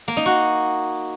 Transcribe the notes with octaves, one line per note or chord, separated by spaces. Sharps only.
A#3
D#4
F#4